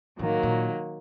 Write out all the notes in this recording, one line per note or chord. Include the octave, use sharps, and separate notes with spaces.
A2 D#3 F#3 A#3
A#2